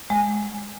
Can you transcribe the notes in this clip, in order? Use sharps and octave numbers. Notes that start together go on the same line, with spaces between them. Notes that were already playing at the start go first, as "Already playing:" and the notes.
G#3